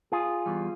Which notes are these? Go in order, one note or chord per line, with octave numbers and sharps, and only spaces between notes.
F4 G#4
E2 E3 G3